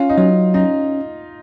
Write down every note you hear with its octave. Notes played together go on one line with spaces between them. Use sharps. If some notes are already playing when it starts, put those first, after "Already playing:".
Already playing: C#4 F4
D#4
F#3 F4
C#4 D#4